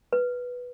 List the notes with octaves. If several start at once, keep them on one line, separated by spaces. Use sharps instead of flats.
B4